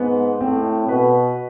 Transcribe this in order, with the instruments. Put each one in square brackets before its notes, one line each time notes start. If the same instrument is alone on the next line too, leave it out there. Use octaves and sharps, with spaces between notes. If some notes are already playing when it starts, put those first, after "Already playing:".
Already playing: [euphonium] G#2 [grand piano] B3
[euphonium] A2 [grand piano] C4
[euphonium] B2 [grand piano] B4